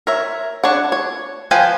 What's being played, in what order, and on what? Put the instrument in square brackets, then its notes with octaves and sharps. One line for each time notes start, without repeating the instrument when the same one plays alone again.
[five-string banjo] A#4 C#5 E5
D4 C#5 F#5
C#5
F3 B4 F5 G5 G#5